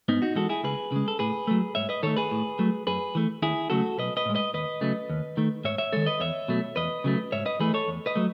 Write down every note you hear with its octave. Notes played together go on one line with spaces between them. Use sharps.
G#2 B3 D#4
D#4 F#4
E3 G#3 F#4 A4
E4 G#4
C#2 G#4 B4
C#3 G#3
A4
A2 G#4 B4
F#3 A3
G#2 C#5 E5
B4 D#5
D#3 A3 A4 C#5
G#4 B4
A2
F#3 A3
F#2 G#4 B4
E3 A3
D#2 E4 G#4
C#3 F#3 A3 F#4 A4
B1 B4 D#5
B4 D#5
A2 G#3
B4 D#5
D#2 B4 D#5
C#3 F#3 A3
D#2
D#3 A3
G#2 C#5 E5
C#5 E5
D#3 G#3 A4 C#5
B4 D#5
E2 C#5 E5
B2 F#3 A3
E2 B4 D#5
C#3 F#3 A3
G#2 C#5 E5
B4 D#5
E3 A3 G#4 B4
A4 C#5
E2
B4 D#5
F#3 A3